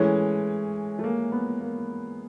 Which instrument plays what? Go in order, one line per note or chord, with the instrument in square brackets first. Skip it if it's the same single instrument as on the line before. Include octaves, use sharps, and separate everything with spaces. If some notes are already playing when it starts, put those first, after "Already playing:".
Already playing: [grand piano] E3 G#3 C#4 [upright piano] A3
[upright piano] A3
A#3
B3
A#3